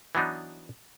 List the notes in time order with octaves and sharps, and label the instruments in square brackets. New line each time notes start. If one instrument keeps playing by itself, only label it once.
[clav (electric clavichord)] E3 F#3 B3 D4 D#4